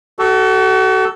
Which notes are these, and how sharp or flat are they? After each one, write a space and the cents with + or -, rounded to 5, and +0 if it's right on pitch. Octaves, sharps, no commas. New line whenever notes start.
F#4 +35 A4 +0